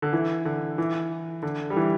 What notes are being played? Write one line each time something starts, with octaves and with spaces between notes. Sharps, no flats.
D3
E3
D3
E3
D3
G3
E3